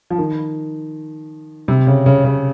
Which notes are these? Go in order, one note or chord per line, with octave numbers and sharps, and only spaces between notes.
F3
D#3
C3
C#3
C#3
C#3